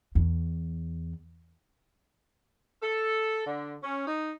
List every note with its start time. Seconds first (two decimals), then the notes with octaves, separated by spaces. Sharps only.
0.15 E2
2.82 A4
3.45 D3
3.83 C#4
4.07 D#4